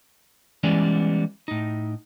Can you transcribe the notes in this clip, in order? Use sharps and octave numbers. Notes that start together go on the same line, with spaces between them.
E3 G3 G#3 B3 C#4 D5
A2 D#4